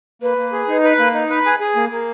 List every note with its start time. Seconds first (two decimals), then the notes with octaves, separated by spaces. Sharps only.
0.22 A#3 B4
0.37 A#3
0.52 G#4
0.68 D#4
0.84 B4
0.99 A#3
1.14 D#4
1.30 B4
1.45 G#4
1.60 G#4
1.76 A#3
1.91 A#3